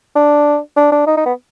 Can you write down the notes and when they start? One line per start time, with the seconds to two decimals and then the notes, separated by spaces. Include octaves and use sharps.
0.16 D4
0.77 D4
0.92 D4
1.07 D#4
1.17 D#4
1.26 B3